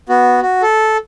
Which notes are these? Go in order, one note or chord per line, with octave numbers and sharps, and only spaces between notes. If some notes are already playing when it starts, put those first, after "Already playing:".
B3 F#4
F#4
A4